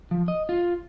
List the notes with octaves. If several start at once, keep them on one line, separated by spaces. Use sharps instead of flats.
F3
D#5
F4